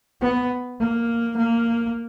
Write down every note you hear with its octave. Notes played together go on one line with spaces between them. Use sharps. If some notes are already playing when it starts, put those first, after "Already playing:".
B3
A#3
A#3